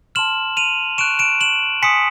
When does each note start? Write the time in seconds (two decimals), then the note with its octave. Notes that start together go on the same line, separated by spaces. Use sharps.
0.15 A5 C6 F6 E7 F#7
0.57 D#7 F7
0.98 C#6 F#6 D7 E7
1.19 D7 E7
1.41 E7 F#7
1.82 G#5 C6 D#6 B6 C#7